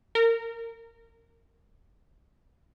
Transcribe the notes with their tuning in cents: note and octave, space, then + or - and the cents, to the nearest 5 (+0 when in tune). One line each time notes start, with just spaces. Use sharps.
A#4 -25